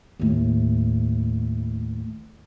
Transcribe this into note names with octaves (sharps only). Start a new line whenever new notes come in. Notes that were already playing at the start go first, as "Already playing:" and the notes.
D#2 A2